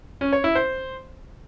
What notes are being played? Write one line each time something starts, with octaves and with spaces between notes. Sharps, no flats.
C#4
C#5
E4
C5